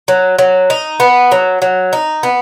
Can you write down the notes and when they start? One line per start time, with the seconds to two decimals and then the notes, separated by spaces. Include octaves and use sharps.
0.08 F#3
0.39 F#3
0.70 D#4
1.00 B3
1.32 F#3
1.62 F#3
1.93 D#4
2.23 B3